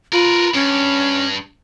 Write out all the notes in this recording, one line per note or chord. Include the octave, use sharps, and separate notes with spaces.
F4 A#4 B4
G2 C#4